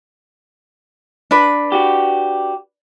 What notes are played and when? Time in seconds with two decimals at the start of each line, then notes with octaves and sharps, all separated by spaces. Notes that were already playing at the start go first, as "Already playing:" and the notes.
1.31 D4 B4
1.72 F#4 G4